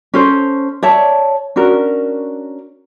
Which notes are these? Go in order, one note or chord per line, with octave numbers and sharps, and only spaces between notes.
C#4 A4 C5
C#5 D5 E5 A5
C#4 D4 F#4 A#4